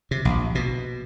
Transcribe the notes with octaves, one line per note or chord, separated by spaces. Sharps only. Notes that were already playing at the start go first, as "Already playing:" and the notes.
C3
A#1
B2